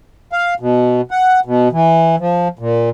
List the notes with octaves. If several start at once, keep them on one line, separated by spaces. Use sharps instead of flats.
F5
B2
F#5
B2
E3
F3
A#2